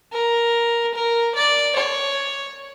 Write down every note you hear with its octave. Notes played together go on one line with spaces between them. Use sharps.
A#4
A#4
D5
C#5